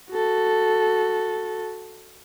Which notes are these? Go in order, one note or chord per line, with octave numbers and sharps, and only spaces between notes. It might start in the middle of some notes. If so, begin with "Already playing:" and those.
F#4 A4